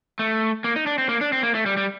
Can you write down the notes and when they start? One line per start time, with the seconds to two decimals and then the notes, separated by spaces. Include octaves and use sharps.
0.19 A3
0.64 A#3
0.76 D#4
0.86 D4
0.98 C4
1.09 A#3
1.21 D4
1.33 C4
1.43 A#3
1.55 A3
1.66 G3
1.77 G3